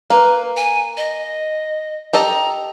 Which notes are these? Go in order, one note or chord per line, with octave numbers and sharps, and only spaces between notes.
A#3 B4
G#5
D#5
G4 A4 D#5 A#5